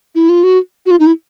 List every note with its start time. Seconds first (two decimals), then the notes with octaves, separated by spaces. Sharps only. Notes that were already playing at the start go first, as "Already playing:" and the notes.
0.15 E4
0.29 F4
0.43 F#4
0.86 F#4
0.91 F4
1.00 D#4
1.06 E4